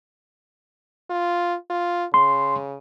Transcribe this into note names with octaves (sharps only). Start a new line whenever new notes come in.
F4
F4
C#3 C6